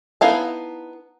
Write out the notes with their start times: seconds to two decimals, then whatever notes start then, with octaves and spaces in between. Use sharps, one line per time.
0.21 B3 D#4 E4 F5 A5